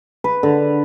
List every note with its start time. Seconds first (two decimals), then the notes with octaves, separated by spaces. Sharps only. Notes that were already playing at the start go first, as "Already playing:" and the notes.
0.24 B4
0.43 D3